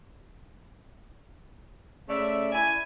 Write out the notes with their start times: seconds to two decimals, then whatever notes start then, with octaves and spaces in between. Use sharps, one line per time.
2.09 C#3 A3 A4 D5 E5
2.52 E4 D5 G#5